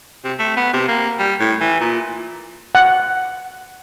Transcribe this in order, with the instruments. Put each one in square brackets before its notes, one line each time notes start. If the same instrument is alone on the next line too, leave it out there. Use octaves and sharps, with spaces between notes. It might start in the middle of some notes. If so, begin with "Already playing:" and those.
[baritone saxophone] C3
A3
B3
C3
A#3
G3
A2
E3
A#2
[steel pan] F#5